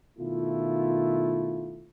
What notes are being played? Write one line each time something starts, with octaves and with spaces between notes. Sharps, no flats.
B2 D#3 A3 E4 F4